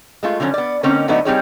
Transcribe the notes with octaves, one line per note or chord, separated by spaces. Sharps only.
G#3 A3 F4
D3 F3 F#3 C#4
B3 D5
D3 A#3 C4 C#4 D#4
D3 F#3 A3 B3 D4 D#4
G3 C4 D#4 G4 G#4 C#5